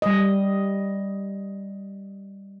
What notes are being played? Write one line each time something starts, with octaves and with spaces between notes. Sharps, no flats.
G3 D#5